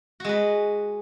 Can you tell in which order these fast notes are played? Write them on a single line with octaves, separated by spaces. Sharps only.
F#4 G#3 B4